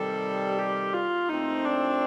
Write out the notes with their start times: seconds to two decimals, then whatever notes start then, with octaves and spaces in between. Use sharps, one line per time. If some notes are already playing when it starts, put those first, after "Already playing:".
Already playing: C3 D#3 G3 A4
0.59 G4
0.94 F4
1.30 A#2 A3 C4 D#4
1.65 D4